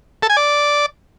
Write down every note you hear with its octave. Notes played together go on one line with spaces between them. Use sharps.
A4
G#5
D5